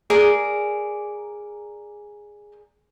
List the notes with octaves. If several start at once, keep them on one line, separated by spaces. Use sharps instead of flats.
G#4 A#4 D5